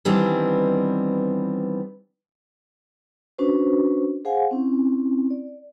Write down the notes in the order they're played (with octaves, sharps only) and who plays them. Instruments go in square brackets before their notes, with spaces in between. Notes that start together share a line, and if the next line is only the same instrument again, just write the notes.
[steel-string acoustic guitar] D#3 E3 G3 B3 C4 D4
[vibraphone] C#4 D4 F#4 B4 C5
G#4 C5 F5 F#5 G#5
C4 C#4 E4
D5